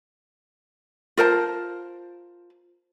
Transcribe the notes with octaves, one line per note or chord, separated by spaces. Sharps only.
F4 A#4 C5 A5